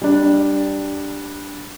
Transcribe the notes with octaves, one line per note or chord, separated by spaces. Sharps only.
G3 D4